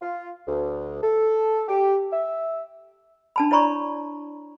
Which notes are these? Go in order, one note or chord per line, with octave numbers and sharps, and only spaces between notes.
F4
D2
A4
G4
E5
D4 A5 B5
E4 C#5 D5 A#5 B5 C#6